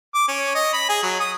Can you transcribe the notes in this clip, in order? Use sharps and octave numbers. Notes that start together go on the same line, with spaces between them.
D6
C#4
D#5
B5
G#4
F#3
D#6